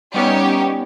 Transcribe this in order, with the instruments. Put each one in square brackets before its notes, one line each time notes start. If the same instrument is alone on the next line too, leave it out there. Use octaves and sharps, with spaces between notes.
[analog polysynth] G3 B3 C#4 [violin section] D#4 G4 C#5